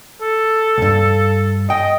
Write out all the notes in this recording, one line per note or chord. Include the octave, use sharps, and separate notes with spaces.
A4
C2 G2
D#5 G5